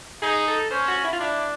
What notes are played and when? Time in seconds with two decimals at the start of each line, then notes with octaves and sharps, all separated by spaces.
0.22 D#4 G#4
0.48 A4
0.71 C#4 C5
0.88 F#4
1.04 E4
1.13 F4
1.20 D4 E4